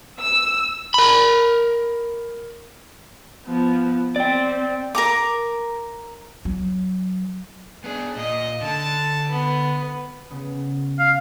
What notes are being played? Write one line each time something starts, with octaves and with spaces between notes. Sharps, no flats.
E6
A#4 B5
F3 B3
C4 D5 G5
A#4 A#5 D6
F#3
B3 D4 G#4
A#2 D#5
D3 A5
B3
C#3 B3
F5